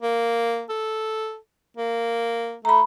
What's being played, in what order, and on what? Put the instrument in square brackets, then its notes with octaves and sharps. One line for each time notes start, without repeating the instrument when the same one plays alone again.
[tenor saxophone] A#3
A4
A#3
[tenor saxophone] A3 [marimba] A#5 B5